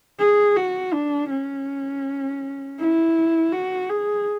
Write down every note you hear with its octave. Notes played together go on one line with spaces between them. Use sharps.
G#4
F#4
D4
C#4
E4
F#4
G#4